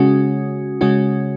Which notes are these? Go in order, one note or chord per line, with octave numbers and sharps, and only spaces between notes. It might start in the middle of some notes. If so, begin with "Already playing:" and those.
Already playing: C#3 G#3 C#4 F#4
C#3 G#3 C#4 F#4